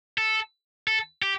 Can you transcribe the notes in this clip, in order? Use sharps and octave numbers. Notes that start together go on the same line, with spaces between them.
A4
A4
G4